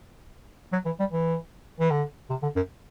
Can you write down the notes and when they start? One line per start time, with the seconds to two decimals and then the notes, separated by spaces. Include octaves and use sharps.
0.73 F#3
0.85 E3
1.00 G3
1.12 E3
1.80 E3
1.91 D3
2.30 C3
2.43 D3
2.56 F#2